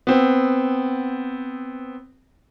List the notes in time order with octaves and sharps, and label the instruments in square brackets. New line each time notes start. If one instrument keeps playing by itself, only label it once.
[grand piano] B3 C4